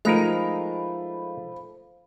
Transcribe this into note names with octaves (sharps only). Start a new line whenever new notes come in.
F3 G#3 A3 D#4 A#4 C5 F5 B5